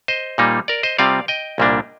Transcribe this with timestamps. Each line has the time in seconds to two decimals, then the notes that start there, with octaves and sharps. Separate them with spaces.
0.08 C5 D#5
0.38 A#2 G3 A#3 D#4
0.68 A#4 D5
0.83 C5 D#5
0.98 C3 G3 C4 F4 D5 F5
1.28 D#5 G5
1.58 C2 A#2 G3 A#3 D4